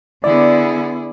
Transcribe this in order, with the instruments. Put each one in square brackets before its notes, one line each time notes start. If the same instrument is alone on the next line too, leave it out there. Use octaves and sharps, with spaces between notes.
[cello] D3 B3 [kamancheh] E4 G#4 [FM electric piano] D5